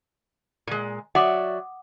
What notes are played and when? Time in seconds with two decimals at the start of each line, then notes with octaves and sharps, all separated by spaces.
0.67 A#2 G#3
1.15 F#3 D5 E5 F#5 D6 D#6